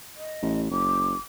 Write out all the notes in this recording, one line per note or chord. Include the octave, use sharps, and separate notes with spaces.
D#5
A1
F#1 D6